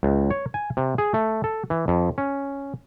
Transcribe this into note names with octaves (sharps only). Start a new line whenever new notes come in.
C#2
C#5
G#5
C3
G#4
A3
A4
E3
F2
C#4